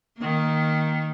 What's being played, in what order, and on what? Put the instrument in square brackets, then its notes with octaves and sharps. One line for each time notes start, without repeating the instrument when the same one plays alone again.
[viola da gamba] D#3 A#3